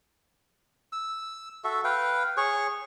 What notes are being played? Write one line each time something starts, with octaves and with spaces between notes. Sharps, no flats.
E6
F#4 A4 E5
B4 F5 G5
G#4 C#5 C#6